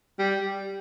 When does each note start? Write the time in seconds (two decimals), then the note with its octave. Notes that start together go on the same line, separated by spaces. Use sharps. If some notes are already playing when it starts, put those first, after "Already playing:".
0.19 G3